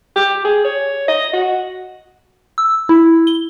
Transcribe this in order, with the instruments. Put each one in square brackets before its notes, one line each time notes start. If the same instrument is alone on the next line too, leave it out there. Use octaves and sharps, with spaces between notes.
[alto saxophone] G4
G#4
C#5
D#5
F#4
[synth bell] E6
E4
G7